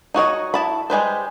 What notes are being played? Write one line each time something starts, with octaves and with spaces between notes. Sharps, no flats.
D#4 F#4 C#5 D#5
E4 A5 B5
G3 G#3 B4 C5